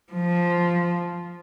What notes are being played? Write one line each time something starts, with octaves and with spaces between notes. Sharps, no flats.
F3